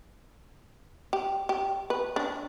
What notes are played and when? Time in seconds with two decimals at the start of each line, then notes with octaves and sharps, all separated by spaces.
1.13 G4
1.49 G4
1.90 B4
2.16 D4